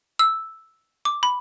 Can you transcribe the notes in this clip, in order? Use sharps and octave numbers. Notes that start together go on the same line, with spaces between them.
E6
D6
B5